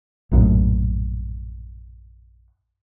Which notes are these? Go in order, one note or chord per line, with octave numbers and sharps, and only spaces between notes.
A#1 F#2 A2